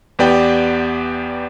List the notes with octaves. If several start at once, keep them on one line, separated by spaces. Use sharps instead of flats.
E2 B3 G4 D5 G5